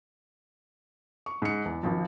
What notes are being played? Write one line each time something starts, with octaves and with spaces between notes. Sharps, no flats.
C#6
G#2 C#7
E2
G#1 F3